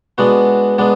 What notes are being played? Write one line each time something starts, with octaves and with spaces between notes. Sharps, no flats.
G#3 B3 D4 F#4
G#3 B3 D4